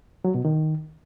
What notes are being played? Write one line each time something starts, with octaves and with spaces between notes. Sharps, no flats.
F#3
B2
D#3